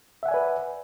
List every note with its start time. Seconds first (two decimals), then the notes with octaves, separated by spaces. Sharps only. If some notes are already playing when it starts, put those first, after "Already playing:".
0.23 E5
0.26 F#5
0.28 G#5
0.31 D5
0.34 B4